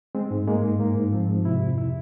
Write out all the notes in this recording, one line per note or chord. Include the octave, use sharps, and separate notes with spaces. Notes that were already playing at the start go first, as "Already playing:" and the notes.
G#3 C4
G#2
G#3 A#3
G#2
G#2 A#3
G#2
F3 C4
G#2
C3 E4
F2
C3 E4